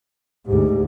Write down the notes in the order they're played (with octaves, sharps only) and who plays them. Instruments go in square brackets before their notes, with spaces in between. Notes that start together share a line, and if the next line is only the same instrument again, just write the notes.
[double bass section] D2 G#2 [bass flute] G4